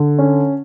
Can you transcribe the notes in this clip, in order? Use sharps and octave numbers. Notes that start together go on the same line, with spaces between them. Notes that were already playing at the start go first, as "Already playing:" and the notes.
Already playing: D3
C#4